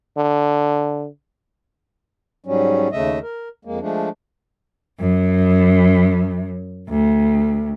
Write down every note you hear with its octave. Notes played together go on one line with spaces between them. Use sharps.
D3
G#2 F#3 G3 C#4
D#2 C#3 A3 D#5 E5
A#4
F2 G#3 A#3
F3 G#3 A3 D4
F#2
D2